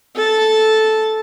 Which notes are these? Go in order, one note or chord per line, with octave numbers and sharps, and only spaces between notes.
A4 A5